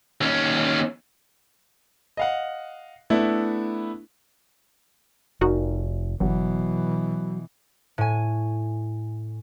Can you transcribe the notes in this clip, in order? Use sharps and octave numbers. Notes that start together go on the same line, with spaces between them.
D#2 C#4
D#5 F5 F#5
A3 B3 D4 E4
F1 D#4 F#4 A#4
G1 B2 E3 F#3
A2 G#5